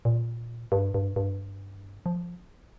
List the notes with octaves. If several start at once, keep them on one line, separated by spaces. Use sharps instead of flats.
A#2
G2
G2
G2
F3